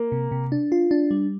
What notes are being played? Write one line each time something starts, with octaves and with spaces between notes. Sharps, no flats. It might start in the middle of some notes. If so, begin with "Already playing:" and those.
Already playing: A#3
C3
C3
D4
F4
D4
G3